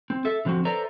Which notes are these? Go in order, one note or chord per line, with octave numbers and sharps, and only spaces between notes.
C4
A4 E5
D3 F3 C4 D#4 F#4
A4 B4 C5 D5 E5 A#5